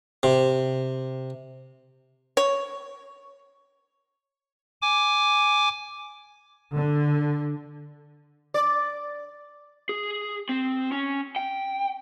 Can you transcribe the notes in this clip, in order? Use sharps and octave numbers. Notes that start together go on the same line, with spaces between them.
C3
C#5
G#5 D6
D3
D5
G#4
C4
C#4
G5